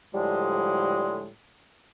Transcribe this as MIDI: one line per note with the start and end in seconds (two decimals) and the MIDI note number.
0.14 1.28 45
0.14 1.28 50
0.14 1.28 53
0.14 1.28 55
0.14 1.28 56